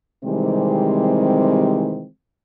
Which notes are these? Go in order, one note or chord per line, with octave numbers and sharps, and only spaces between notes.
C3 D#3 E3 G3 G#3 C4